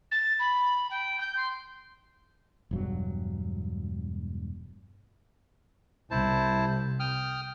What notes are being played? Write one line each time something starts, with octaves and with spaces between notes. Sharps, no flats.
A6
B5
G5
G6
C6
E1 G2 F#3
C2 E4 C5 A5
G5 D#6 F6